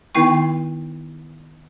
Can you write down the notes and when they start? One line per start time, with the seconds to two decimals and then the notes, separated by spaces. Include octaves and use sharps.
0.15 D#3 B3 D#4 E4 G5 C#6